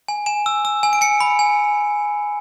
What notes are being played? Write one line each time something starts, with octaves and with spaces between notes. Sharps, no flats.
G#5
G#5 E7
E6
E6
G#5
D7
G#5 C#7
B5
G#5